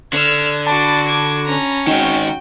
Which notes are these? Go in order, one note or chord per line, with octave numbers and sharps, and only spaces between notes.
D3 E6 F6 G#6
D4 F#4 A5 B5 D6 A6
D6 G#6
C#4 A#5
D#3 G#3 D#4 F#4 G5